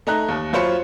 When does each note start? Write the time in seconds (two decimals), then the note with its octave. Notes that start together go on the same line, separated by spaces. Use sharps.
0.07 A3 D#4 A#5 F#6
0.28 D#2
0.53 F#2 F4 C5 C#5 B5 C#7